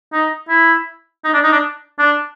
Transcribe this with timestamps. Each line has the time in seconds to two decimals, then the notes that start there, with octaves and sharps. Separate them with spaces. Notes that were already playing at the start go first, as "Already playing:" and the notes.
0.13 D#4
0.49 E4
1.25 D#4
1.34 D4
1.44 D#4
1.52 D4
1.99 D4